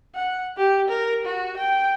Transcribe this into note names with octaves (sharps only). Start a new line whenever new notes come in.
F#5
G4
A#4
F#4
G5